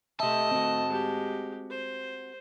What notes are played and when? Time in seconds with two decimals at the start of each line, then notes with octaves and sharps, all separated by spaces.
0.20 A3 G4 D#5 E5 A5
0.51 C4 F#4
0.88 G#3 G4
1.70 C5